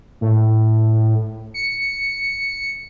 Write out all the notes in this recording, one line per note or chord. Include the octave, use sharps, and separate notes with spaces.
A2
C#7